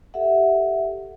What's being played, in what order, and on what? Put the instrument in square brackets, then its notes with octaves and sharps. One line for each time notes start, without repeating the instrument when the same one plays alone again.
[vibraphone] G4 A4 E5 F#5